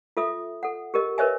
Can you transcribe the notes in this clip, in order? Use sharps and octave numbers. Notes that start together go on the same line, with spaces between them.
F4 A4 E5 D#6
A4 F#5
G4 A#4 D#5
A#4 B4 C#5 D#5 E5 G#5